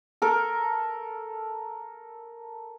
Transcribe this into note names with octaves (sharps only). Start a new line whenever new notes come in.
A4 A#4